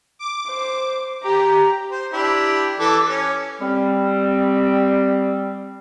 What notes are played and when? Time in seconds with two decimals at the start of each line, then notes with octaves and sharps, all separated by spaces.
0.19 D6
0.47 C5
1.24 G4 A#5
1.92 C5
2.13 D4 E4 G4
2.79 E3 A4 D6
3.09 C#4
3.61 G3 C4